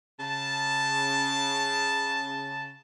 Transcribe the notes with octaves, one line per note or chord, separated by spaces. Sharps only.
C#3 A5